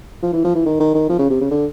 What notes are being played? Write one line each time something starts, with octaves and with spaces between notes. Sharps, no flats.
F3
E3
F3
E3
D#3
D#3
D#3
F3
C#3
C3
C#3
D3